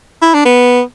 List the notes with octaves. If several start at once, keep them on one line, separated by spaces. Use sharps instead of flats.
E4
D4
B3